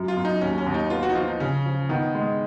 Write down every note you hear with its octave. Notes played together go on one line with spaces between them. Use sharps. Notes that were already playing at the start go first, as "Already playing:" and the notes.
Already playing: F#2
F4
F#2
D#4
D#2 C#4
C#4
D#2
D#4
B3 F4
F#4
D#4
F3 F4
D#4
C#3 C#4
F3
D#3 B3
G#3